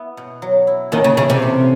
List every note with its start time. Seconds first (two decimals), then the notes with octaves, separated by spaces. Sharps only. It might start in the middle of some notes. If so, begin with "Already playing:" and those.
Already playing: B3 E4
0.17 B2
0.42 F#3
0.67 E4
0.92 D#2 D#3 C#4
1.04 C#3
1.17 C#3 E3
1.30 C3
1.42 A3